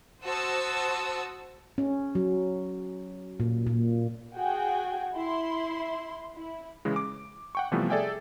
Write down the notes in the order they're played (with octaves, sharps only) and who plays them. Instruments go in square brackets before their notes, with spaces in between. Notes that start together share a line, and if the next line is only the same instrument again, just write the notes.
[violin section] F#4 C5 A5 D#6 E6
[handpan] C#4
F#3
A#2
A#2
[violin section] F#4 G#4 G5 G#5
E4 C6
E4
[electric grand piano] C#3 E3 G#3
D6
F#5 G5 C#6
C3 E3 F3 G3 A3 B3
G#4 A4 D5 E5 G5 G#5